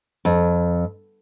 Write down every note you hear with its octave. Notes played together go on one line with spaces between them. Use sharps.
F2